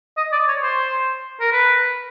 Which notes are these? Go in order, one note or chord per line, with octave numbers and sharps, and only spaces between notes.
D#5
D5
C#5
C5
A#4
B4